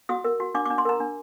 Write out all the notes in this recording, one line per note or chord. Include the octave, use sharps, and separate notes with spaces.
F#4 D#6
A#4
F#4
D4 D6
D6
D4
C6
A#4 A#5
D4